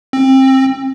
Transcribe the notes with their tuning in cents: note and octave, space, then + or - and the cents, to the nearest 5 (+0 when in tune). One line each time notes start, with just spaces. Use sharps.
C4 +25